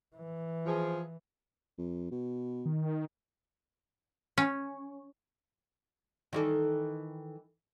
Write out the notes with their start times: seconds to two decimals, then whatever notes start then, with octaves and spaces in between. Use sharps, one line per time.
0.16 E3
0.66 F3 G#4
1.78 F2
2.11 B2
2.66 D#3
4.38 C#4
6.33 D#3 E3 A4